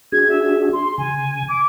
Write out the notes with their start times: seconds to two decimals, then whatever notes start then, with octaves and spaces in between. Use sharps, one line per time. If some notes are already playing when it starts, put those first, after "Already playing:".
0.12 D4 F#4 G#4 G#6
0.29 E5
0.73 C6
0.98 C#3 G#5
1.48 D6